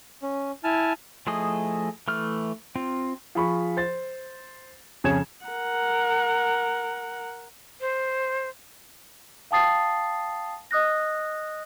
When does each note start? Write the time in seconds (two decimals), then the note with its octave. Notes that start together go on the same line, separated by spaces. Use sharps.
0.22 C#4
0.64 E4 G#5 A5 F6
1.27 F3 A3 E4 G#4 D#5
2.08 E3 A3 F6
2.75 C4 F4
3.35 F3 G#4 B5 C#6
3.77 C5 A6
5.04 F2 C#3 G#4 C#5 G#6 E7
5.45 A#4 F#5
7.81 C5
9.51 F5 G5 A5 D#6 A6 C7
10.71 D#5 D#6 F#6 A#6